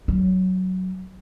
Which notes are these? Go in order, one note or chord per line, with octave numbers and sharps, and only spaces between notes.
F#3